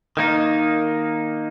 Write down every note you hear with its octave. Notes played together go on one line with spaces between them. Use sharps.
D#3 A#3 D#4